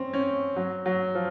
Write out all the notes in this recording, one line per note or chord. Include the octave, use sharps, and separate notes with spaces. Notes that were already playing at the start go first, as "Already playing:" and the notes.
Already playing: C4 C#4
C#4
F#3
F#3
F3